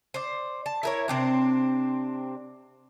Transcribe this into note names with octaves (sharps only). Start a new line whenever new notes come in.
C5 D5
A5
E4 A#4 C#5
C3 C4 D4